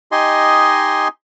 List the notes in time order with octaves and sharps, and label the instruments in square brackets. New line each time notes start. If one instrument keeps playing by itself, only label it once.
[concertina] D#4 G4 D#5 G#5 C6